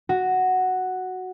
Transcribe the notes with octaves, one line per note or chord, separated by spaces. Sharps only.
F#4